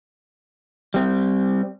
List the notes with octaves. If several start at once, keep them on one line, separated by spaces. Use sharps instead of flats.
G3 C4